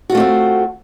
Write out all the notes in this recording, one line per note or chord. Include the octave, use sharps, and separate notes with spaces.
A3 C4 D4 F4 F#4